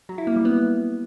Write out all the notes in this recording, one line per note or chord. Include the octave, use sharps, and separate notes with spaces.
F#3
E4
A#3
G3
B3